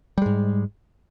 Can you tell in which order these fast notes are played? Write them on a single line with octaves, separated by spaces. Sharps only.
G3 G#3 G#2